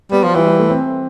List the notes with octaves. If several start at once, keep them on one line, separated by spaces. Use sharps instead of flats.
G3 B3
F3 F4
E3 G3
G3
A3
C4